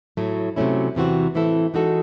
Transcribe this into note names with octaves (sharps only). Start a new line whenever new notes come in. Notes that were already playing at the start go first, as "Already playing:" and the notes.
A2 F#3 A3
C3 F#3 A3 C#4 E4
E2 C3 E3 C4 F#4
A2 E3 C4 E4 A4
E3 G#3 D#4 F#4 A4